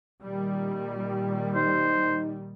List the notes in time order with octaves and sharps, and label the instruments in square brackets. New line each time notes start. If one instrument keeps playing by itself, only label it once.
[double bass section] A#2 D#3 G3
[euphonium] D#4 [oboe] C5